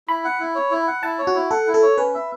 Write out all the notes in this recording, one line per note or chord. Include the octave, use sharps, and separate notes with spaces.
E4 B5
F#5
E4
C#5
E4
F#5
E4 A5
C#5
F#4
E4
A4 F#5
E4
A4
C#5
C#4 B4
E5